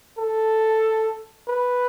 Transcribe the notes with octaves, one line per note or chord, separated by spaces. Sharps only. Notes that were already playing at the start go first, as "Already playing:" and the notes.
A4
B4